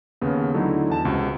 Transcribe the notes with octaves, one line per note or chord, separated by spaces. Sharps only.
D#2 C#3 B3
D3 F#3 A3 D#4 E4
E2 A5 E7
C#2 C3 F#4